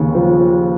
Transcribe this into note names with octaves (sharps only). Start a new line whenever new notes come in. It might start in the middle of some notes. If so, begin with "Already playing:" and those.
Already playing: D#2 C#3
F3